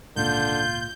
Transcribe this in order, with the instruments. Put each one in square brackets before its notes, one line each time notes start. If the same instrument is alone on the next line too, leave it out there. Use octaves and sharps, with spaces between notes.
[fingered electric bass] G#1 C#2 A#2 [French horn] D3 [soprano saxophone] F4 [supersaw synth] G6